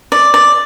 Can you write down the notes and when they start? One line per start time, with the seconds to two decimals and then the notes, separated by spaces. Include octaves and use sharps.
0.12 D5
0.34 D5